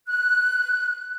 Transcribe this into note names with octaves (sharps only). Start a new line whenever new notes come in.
F#6